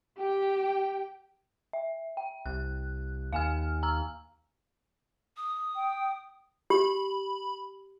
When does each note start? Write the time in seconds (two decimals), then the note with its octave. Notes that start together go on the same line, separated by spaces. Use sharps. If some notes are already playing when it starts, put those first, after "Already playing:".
0.18 G4 G5
1.73 E5
2.17 G5
2.46 C2 F#6
3.33 D#2 F5 G#5 F6
3.83 A#5 E6 F6
5.37 D#6
5.76 G5
6.70 G4 B5